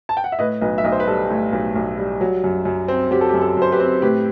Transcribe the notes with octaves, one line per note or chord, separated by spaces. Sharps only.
A5
G5
F#5
E5
A2 B4 D#5
B1 B4 D#5
E5
B1 D#5
C5
B4
G3 A4
A2
B1
B1
G3
F#3
F#2
F#2
C4
F#3 G4
A4
G4
F#2
A4
F#2 C5
G4 B4
C4
A2 G4 B4